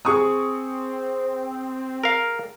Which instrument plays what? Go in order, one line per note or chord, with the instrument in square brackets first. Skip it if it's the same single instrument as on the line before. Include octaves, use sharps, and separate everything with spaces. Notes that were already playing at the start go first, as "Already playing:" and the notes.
[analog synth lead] C4 [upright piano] G#4 C#6 D#6
[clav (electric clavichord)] A#4 F5